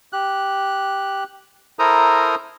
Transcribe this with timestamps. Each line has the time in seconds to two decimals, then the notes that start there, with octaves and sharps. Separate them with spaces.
0.13 G4 F#6
1.79 E4 A4 A#4 C5 A#5 D#6